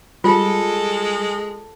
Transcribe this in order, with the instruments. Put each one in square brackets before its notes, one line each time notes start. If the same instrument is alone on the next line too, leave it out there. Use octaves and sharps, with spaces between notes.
[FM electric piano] G3 [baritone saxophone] G#3 [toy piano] F4 [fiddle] A4